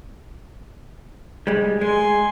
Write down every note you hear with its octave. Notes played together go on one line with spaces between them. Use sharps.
G3 G#3
G#3 G#5 C6